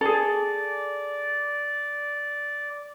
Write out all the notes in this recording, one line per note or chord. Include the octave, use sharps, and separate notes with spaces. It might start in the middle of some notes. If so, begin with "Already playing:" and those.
G#4 A4 D5